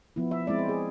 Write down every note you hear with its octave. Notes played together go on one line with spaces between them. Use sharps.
F3 B3 E4
E5
G#3 C4 E4 D5
C5
G#4